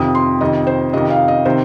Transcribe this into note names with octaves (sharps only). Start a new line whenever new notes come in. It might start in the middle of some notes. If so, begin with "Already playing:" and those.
Already playing: F2 C3 D#3 D#6
C6
F2 C3 D#3 D#5
C5
F2 C3 D#3 D#5
F5
D#5
C3 D#3 C5